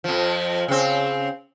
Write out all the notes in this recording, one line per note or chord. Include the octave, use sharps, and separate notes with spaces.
F2 F3
C#3 C4